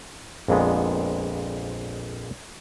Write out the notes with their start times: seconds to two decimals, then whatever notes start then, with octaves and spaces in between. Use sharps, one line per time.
0.48 A#1 F2 A#2 G#3 B3